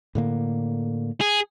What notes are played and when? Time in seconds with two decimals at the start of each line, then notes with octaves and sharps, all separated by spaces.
0.15 A2 D3 A#3
1.21 G#4